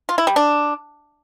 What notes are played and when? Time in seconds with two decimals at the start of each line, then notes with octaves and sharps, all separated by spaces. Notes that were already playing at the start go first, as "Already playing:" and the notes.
0.09 F4
0.18 E4
0.27 G3
0.36 D4